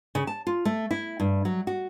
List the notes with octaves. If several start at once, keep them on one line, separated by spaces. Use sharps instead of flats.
C#3
A5
F4
A3
E4
G2
F#3
F#4